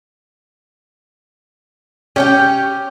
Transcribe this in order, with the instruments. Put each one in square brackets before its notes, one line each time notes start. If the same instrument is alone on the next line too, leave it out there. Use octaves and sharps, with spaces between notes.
[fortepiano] C#4 [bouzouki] G4 C#5 G5